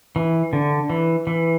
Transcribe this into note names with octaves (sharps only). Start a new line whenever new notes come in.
E3
D3
E3
E3